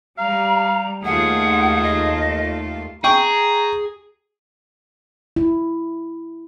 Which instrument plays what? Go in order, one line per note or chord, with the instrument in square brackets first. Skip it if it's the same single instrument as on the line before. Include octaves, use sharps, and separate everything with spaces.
[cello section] G3 [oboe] F5 [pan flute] A#5
[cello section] D#2 A3 F4 [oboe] G#4 [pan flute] F#5
[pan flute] D#5
[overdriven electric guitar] G#4 [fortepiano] G5 C#6 [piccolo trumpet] A#5
[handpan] E4